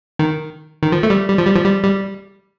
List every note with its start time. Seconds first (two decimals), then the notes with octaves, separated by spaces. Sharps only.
0.19 D#3
0.82 D#3
0.92 F3
1.03 A3
1.10 G3
1.29 G3
1.38 F3
1.47 G3
1.56 F3
1.65 G3
1.84 G3